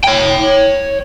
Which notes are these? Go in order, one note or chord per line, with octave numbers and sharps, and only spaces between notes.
C#5 G5